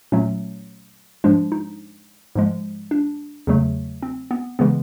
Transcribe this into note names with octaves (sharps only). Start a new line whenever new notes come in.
A#2 F#3 A3 C#4
G#2 F3 G#3 D4
D#4
G#2 F3 G#3
D4
E2 C#3 F#3 A3
C4
B3
C#3 E3 G#3 B3